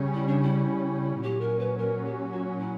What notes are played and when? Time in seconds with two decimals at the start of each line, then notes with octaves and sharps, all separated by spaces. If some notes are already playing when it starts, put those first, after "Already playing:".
Already playing: C#3 G3 C#4
0.14 E4
0.27 D4
0.42 E4
1.23 A#2 F#3 C#4 G4
1.41 A#4
1.59 B4
1.78 A#4
2.05 G4
2.32 F#4
2.59 E4